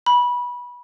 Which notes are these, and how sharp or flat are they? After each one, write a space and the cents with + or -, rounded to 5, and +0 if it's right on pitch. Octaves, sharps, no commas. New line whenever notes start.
B5 -20